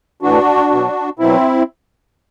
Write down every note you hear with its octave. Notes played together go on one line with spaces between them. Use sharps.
A2 E3 D4 F#4
B2 F#3
B2 F#3 C4 E4